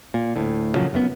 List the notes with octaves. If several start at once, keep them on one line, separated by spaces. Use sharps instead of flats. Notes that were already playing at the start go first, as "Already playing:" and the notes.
A#2
D2 A2
A#2 C#3 F3 F#3
F1 F#2 A2 B3